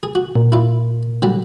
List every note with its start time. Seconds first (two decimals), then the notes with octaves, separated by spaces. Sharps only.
0.03 G#4
0.15 F#4
0.35 A#2
0.52 E4 F4
1.22 D3 F#3 G3